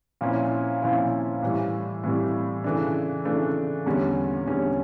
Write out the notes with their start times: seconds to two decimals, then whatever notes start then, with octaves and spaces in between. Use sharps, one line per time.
0.21 A#2 F3 C#4 E4
0.82 A#2 F3 C#4 E4
1.42 A2 E3 G3
2.04 A2 E3 G3
2.64 C#3 E3 A3 D4
3.25 C#3 E3 A3 D4
3.86 E2 D3 G3 C#4
4.47 E2 D3 G3 C#4